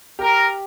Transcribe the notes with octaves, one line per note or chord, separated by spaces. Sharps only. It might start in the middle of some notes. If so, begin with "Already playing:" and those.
G4 A#4